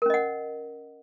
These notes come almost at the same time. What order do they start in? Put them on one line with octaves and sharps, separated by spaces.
A#4 C#4 D#5 F#5